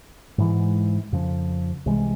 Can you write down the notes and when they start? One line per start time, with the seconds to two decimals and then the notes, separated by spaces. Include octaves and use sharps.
0.38 G#2 E3 G#3
1.12 F2 C#3 F3
1.86 C2 C3 E3 G#3